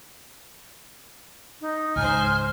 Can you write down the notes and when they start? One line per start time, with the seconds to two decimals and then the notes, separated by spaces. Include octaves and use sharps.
1.61 D#4
1.96 C#2 G#2 C5 G#5 F6